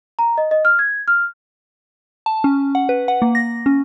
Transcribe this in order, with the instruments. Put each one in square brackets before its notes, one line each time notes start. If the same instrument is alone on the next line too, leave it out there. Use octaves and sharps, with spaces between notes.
[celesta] A#5
D#5
D#5
F6
G#6
F6
[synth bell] A5
C#4
F#5
B4
F#5
A#3
A#6
C#4